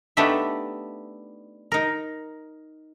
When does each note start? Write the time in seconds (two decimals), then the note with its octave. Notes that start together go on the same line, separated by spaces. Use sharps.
0.17 A3 B3 D4 D#4 G4 E5
1.72 D#4 A#4